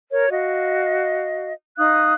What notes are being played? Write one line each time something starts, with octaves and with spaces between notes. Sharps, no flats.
A#4 C#5
F#4 D#5 F5
D#4 F5 D#6 F#6